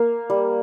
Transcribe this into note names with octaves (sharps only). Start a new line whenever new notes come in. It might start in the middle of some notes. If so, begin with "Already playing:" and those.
Already playing: A#3 F5
G3